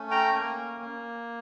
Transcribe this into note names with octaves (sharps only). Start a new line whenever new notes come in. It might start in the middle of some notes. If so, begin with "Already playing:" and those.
Already playing: A3 C#4
G5 A#5
A#3
A#3